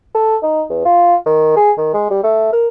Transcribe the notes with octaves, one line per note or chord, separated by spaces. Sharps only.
A4
D#4
E2
F4
D#3
G#4
D#3
G#3
G3
A3
A#4